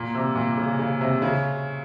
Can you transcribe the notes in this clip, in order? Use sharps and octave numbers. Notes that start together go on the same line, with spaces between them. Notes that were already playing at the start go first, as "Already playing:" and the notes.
Already playing: A#2
C3
A#2
C#3
C#3
C3
C#3